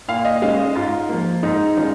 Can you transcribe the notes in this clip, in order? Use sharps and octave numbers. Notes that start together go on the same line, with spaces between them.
A#2 F5
D#5
G#3 C#4 F5
D#5
G#2 F4
F3 A#3
G#2 D#4
D#3 G#3 C#4 F4